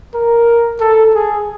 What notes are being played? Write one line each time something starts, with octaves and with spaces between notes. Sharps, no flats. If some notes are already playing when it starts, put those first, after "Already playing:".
A#4
A4
G#4